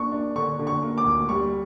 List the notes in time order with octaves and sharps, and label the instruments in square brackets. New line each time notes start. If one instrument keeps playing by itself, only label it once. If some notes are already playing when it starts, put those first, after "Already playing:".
Already playing: [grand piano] A#3 D4 [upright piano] C#6
[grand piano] D4
[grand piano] D3 [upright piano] C#6
[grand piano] D3
[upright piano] C#6
[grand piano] A#3
[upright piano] D6
[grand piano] D2
[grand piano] G3 [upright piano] C#6